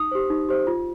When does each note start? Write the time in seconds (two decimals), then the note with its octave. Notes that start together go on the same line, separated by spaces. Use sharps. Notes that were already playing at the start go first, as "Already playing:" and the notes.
Already playing: D#4 D#6
0.11 G4 C5
0.30 D#4
0.49 G4 C5
0.67 F4